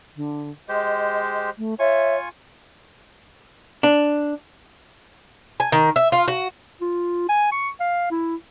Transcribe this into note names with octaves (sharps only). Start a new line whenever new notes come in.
D3
G#3 G4 C5 D#5
A3
F4 C#5 E5 G#5 C#6
D4
G#5
D#3
E5
F4
F#4
F4
G#5
C#6
F5
E4